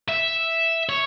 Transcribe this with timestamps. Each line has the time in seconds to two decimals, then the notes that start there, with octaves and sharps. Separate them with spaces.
0.09 E5
0.89 C#5